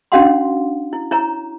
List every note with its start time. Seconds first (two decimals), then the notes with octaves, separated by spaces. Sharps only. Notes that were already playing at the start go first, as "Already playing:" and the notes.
0.12 C#4 D4 F#4 F5 F#5 C6
0.93 E4
1.11 E4 C#5 A#5